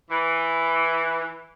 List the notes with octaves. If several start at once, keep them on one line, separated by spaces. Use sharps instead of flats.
E3